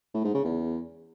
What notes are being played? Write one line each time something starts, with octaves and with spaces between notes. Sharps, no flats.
A2
G#2
C#3
E2